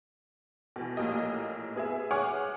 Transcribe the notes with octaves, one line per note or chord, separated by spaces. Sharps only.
B2 E3
A#1 A2 A#3 G4 D#5
B3 G#4 E5
G#4 C#5 F#5 G#5 D6 F6